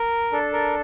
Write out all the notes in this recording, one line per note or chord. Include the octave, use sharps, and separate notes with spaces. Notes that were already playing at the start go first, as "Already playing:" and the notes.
Already playing: A#4
D4 A4
A#4